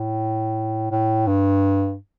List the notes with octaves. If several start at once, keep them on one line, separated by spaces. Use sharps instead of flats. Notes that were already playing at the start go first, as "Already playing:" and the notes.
Already playing: A2
A2
G2